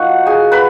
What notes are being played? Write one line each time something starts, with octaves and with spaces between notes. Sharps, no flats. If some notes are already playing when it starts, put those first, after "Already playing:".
Already playing: F3 A#3 D#4 F#4 F#5
G#4 G#5
B4 B5